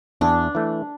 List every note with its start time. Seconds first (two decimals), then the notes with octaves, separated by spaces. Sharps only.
0.21 E2 D4
0.55 E3 A3